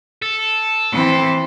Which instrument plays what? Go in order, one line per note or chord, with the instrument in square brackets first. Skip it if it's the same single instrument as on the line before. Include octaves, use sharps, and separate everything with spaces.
[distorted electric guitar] A4
[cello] E3 C4